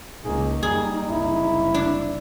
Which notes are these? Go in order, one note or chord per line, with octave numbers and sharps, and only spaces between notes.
C#2 A#3 D#4 G#4
F#2 G3 A#3 G#4
F#1 C2 E4
D4